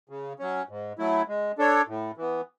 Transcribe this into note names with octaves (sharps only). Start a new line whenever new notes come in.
C#3
F#3 C#4
G#2
F#3 A3 E4
G#3
D4 A4 C#5
A2
E3 B3